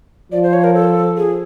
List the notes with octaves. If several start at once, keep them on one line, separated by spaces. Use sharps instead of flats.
F3 D5
C5
C#5
A#4
A4
G#4